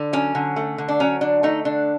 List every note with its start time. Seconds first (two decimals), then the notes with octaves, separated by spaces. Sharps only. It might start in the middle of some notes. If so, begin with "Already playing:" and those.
Already playing: D3
0.13 F#3 C#4
0.35 D3
0.56 A3
0.78 D3
0.88 D4
1.00 F#3 C#4
1.21 D3 D4
1.43 A3 D#4
1.65 D3 D4